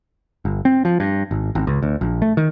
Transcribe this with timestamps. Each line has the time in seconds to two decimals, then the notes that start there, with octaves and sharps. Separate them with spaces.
0.45 G1
0.65 C4
0.85 F3
1.00 G2
1.31 G#1
1.55 G#1
1.67 C#2
1.82 D2
2.01 A#1
2.22 A3
2.37 D#3